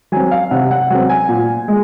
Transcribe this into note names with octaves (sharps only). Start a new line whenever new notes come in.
F#3 C4 G#5
F5
C3 F#5
F#5
F#3 C4 F#5
G#5
A#2
G#3